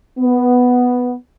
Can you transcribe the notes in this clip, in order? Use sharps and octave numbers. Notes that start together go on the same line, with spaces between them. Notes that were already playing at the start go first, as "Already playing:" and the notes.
B3